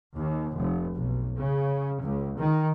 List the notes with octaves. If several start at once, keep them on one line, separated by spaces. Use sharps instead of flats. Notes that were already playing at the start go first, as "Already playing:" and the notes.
D#2
F1
B1
C#3
C#2
D#3